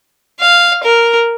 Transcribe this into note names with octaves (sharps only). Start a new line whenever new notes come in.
F5
A#4